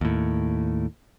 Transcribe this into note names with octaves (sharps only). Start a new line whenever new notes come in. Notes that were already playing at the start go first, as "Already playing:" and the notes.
D#2 A2